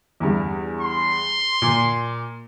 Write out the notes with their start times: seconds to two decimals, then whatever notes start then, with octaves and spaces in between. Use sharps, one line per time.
0.20 E2 G2
0.81 C6
1.62 A#2